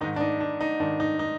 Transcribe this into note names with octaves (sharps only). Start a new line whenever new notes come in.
G#2 D#3 D#4
D4
D#4
D4
D#4
G#2 D#3 D4
D#4
D#4